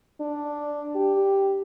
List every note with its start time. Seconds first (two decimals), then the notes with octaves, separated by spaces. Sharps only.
0.20 D4
0.96 G4